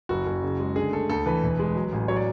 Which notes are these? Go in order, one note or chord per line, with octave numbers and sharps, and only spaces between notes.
F#1 F#4
F#1
C#3
G#3
D3 G#4
A3 A4
D2 A4
E3 B4
E1
G#3
F#3
A1
F#3 C#5
D5